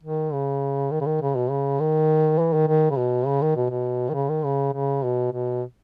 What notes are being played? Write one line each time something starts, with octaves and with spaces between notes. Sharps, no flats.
D#3
C#3
D#3
C#3
D#3
C#3
B2
C#3
D#3
E3
D#3
D#3
C#3
B2
C#3
D#3
B2
B2
D#3
C#3
D#3
C#3
C#3
B2
B2